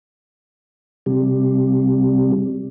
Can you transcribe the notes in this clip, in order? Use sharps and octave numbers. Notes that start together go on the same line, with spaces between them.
C3 G3